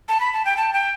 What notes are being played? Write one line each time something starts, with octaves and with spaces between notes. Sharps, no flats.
A5
B5
A5
G5
A5
G5